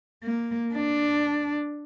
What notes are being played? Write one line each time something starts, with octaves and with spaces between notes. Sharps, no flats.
A#3
D4